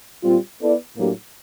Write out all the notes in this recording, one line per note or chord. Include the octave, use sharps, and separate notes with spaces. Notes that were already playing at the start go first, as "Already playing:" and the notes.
A#2 G3 C4 F4
B3 E4 A4 D5
A2 F#3 A#3 D4 G4